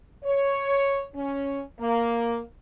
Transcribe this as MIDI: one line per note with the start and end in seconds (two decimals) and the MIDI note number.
0.25 1.05 73
1.15 1.62 61
1.80 2.39 58